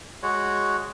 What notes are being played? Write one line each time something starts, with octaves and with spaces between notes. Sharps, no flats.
G#3 F#4 C#5